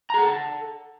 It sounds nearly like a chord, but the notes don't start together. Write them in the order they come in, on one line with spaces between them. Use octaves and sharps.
A#5 G#4 F#5 A4 A5